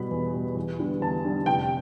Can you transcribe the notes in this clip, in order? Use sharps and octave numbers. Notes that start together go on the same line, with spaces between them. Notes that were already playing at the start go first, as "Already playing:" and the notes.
Already playing: B2 G3 B5
E2
B2 G3
E2
D3 G3 B3
E2 A5
D3 G3 B3
F1 G5